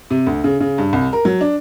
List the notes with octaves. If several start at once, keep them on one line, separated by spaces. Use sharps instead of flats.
C3
D2
C#3
C#3
G2
C2
A#4
F#3
D4